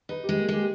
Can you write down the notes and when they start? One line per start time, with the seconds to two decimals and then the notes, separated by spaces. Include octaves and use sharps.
0.09 D#4 B4
0.24 G#3 G4
0.39 A#3
0.48 G#3 G4